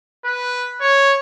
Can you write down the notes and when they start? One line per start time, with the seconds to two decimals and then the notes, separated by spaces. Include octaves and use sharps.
0.25 B4
0.81 C#5